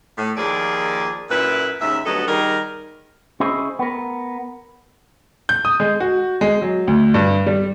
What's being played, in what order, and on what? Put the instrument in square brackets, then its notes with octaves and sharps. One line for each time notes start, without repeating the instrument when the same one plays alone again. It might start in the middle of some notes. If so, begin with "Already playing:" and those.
[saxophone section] A2
D#2 F3 A#3 G#4 D5
F#2 A#2 E4 B4
D#2 G#2 C#4 E5
D2 F#3 G3 B3 A4 D#5
D#3 G3 D#4 G#4 A#4
[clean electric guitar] C#4 E4 G#4 C5 D#5
B3 A#4
[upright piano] G6
D#6
G#3
F#4
G#3
F#3
D2
G2
G3